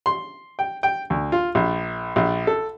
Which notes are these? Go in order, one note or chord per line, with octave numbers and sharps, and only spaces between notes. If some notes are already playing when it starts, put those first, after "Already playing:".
C6
G5
G5
D2
F4
A#1
A#1
A4